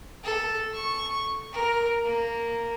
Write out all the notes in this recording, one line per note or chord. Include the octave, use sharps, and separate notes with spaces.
A4
C#6
A#4
A#3